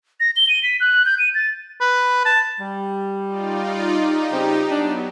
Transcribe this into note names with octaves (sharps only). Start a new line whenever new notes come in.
A#6
G7
D#7
B6
F#6
G6
D#7
A6
B4
A5
G3
D#4 F4 D5
D#4 G4
C#3 G3 C4
F#3 B3 D4